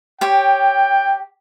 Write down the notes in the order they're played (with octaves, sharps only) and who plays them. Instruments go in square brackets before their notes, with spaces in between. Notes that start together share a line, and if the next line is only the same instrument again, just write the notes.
[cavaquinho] G4 C#5 [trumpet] G5